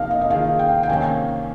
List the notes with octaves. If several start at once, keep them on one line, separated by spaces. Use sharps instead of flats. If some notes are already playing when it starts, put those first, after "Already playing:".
Already playing: C3 F3 A#3 D#4 D#5 F5
D#5
D#5
D#3 A#3 F4 G#4 F5
G5
G5
C3 D#3 A#3 C#4 G#5